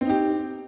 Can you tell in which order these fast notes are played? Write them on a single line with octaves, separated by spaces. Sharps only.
C4 D#4 G4